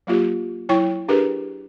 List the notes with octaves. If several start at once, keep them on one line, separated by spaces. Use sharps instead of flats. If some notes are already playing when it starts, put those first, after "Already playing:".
F#3 A#3 F4 G4
F#3 E4 C#5 G5 C#6
D4 G4 G#4 A#4 B4